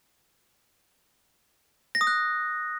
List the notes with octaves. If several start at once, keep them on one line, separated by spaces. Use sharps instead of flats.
A#6
D#6
F#6